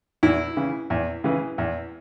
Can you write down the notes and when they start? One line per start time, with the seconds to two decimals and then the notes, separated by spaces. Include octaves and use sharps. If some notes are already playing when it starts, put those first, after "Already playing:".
0.23 E2 E4
0.57 C#3 E3
0.90 E2
1.24 C#3 E3
1.58 E2